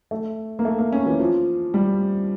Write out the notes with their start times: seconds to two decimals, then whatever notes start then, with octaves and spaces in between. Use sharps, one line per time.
0.11 A3
0.59 A#3
0.65 A3
0.79 A#3
0.92 C#4
1.06 E3
1.20 F3
1.74 G3